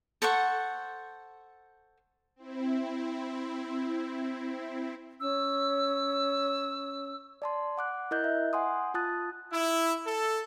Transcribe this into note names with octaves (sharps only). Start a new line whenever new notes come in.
A4 C5 F#5 C#6
C4 E4
C#4 E6
D5 A5 C6
F#5 D6 F#6
E4 A#4 D#5 F#6 G6
E5
F#5 G#5 C6 D#6
F4 A5 D#6 F#6 A6
E4
A4